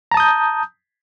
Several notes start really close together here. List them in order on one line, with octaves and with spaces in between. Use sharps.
A#5 A5 D#6 G6